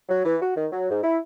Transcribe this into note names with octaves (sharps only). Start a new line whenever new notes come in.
F#3
E3
F#4
D#3
F#3
G#2
E4